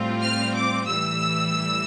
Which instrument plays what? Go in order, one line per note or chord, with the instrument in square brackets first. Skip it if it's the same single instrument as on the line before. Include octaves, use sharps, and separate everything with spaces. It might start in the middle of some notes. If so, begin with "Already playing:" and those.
Already playing: [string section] A2 G3 C4 F4
F6
D6
A2 E3 G3 E6